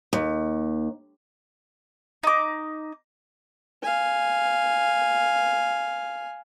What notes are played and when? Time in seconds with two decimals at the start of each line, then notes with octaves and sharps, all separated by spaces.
0.13 D#2
2.23 D#4 D6
3.82 F5 G#5